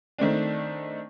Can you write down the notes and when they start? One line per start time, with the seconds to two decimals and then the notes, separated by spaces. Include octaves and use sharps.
0.18 D#3 A3 C4 D4